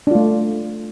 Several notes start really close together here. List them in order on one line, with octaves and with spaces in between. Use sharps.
D4 F4 A3